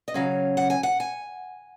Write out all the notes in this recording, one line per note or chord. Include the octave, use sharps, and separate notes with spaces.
D#5
C#3 F#3 C#4 F5
F#5
G#5
F#5
G#5